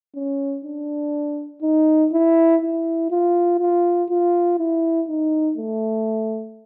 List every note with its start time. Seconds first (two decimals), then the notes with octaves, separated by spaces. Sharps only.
0.15 C#4
0.65 D4
1.62 D#4
2.12 E4
2.61 E4
3.11 F4
3.59 F4
4.09 F4
4.58 E4
5.08 D#4
5.58 A3